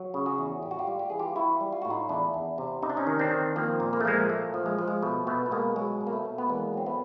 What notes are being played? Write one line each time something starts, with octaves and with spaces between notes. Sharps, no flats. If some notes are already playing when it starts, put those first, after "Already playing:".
Already playing: F#3
C#3
F#4 G#4
E2
A2 G4
F#4
F4 G4
G3
G4
E3 G#4
F4 G4
E3 E4 F#4
G3
F4
A2 F#4
D#4 F4
E2 D4 E4
E2
C3
C3 D#4
D4
C#4 D#4
D#3
C4 D4
D#3
F3 A#3 C4
A#2
A#3
A3
F3 G#3 A#3
A#2 A3
F3
G#3
F3
G#3
B2 A3
B2 A3 B3
B3
B2 G#3 A#3
F#3 G#3
B2
A#3
A3
B2
B3
E2 G#3 A#3
F#3 C4
A3 B3